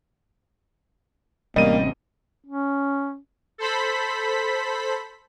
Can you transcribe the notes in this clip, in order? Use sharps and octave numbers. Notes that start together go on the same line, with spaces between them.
A1 C3 G3 A#3 C#4 D#5 D#7
C#4
A4 C5 B5 B6